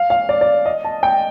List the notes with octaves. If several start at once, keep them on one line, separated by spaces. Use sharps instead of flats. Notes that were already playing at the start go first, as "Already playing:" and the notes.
Already playing: F5
F5
D5
D5
D#5
A5
G5